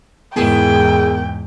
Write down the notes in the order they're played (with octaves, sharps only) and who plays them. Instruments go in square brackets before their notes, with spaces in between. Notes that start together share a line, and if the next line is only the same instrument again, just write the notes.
[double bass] E2 G#2 [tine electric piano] B3 A#4 [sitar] E4 G#4 [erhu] G5